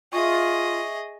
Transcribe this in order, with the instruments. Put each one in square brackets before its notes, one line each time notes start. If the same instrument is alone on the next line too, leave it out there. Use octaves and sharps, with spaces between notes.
[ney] F4 [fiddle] G#4 D#5 [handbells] E5 C#6